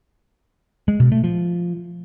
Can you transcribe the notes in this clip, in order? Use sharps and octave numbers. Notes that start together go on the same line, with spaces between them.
G#3
B2
A3
F3